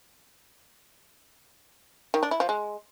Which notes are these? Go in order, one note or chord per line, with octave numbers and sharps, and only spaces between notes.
D#3
D4
E4
F3
G#3